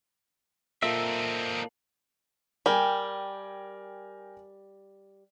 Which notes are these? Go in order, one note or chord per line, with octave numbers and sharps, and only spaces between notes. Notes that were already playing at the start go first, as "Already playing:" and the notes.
A#2 A#3 C4 D#4 A4 E5
G3 A#4 G5 G#5